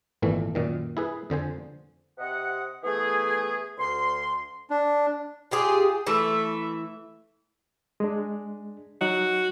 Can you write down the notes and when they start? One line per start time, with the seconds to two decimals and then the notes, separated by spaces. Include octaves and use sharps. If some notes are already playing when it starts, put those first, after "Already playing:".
0.22 G#1 A#2 E3 A3
0.55 F#2 A#2 D#3
0.97 E4 G#4 B4
1.30 F2 D3 C5 G#5
2.18 C3 D#5 F#5
2.84 E3 A3 B3 G#4
3.78 D2 C6
4.70 D4
5.51 F4 G4 G#4
6.07 E3 A3 E5
8.00 G#3 D4
9.01 F#3 D#4 F#4